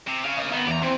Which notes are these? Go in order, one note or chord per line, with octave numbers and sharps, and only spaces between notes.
C3
C#3 F5
D#5 F5
D#3 B3 C4
E2 G4 A#5
E3 C4